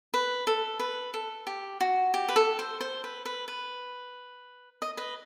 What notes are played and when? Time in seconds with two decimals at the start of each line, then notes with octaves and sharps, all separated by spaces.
0.14 B4
0.47 A4
0.79 B4
1.14 A4
1.47 G4
1.81 F#4
2.14 G4
2.28 B4
2.36 A4
2.59 C5
2.81 C5
3.04 B4
3.25 B4
3.48 B4
4.82 D#5
4.97 B4 D#5